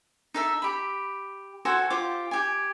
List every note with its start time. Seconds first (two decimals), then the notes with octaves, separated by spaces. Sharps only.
0.34 D#4 A4 E5
0.62 G4 B5
1.65 F#4 A4 C5 G#5
1.90 F4 G4 C5 D6
2.31 G4 G#5